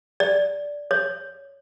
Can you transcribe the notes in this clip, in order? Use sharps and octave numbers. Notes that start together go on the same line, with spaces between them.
D5
C#5